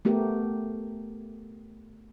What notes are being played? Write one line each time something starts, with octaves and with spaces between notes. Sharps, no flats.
A3 B3 G4 A#4